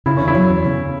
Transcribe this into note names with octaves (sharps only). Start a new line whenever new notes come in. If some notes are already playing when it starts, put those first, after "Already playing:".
C#3 E4
E2 C#4
E4
F#3
E2
C#3